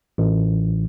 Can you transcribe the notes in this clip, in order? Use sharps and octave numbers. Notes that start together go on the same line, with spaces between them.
A1